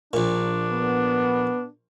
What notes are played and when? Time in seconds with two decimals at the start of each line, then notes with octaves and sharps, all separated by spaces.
0.13 A#1 A#2 D4
0.71 B3